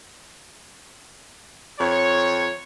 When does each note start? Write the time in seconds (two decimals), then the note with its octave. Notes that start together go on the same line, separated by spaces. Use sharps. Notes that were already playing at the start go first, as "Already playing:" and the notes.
1.80 F2 C#5